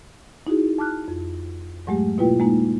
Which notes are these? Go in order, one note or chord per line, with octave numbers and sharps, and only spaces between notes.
D#4 E4 F#4 G#4
A5 D6 F6 F#6
F2
G#2 F#3 G#3 A3 G4
B2 A#3 E4 F4 B4 G5
G#3 A#3 D#4